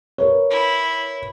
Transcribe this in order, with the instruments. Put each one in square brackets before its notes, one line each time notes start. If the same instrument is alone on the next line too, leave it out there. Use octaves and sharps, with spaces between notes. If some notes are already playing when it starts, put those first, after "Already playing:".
[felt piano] A#4 B4 C#5
[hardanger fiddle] E4